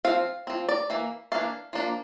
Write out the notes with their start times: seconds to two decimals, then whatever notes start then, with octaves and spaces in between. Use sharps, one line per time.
0.05 F3 C4 F5
0.47 F3 C4
0.69 D5
0.90 E3 A#3
1.32 E3 A#3 D4 F5
1.73 F3 A#3 D4